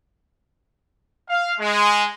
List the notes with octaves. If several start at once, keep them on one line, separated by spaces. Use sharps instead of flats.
F5
G#3